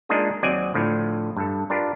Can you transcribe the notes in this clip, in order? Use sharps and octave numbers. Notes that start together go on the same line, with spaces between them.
G#3 A#3 D4 D#4 F4 G#4
D#2 F#3 C4 D5 D#5 G#5
A2 D3 F3
G2 A4
D4 F4 G4 A#4 B4